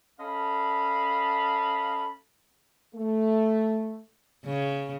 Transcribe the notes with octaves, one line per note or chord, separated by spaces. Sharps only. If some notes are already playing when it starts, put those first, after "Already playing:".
C#4 A4 D#5 F5 A5 B5
A3
C#3